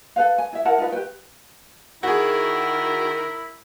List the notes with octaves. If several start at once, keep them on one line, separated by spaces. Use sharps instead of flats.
A4 B4 F5
G#5
E4 E5
E4 A#4 F#5 A5
D#4 F4 B4
G4 B4 G5
D#3 E4 F#4 G#4 A#4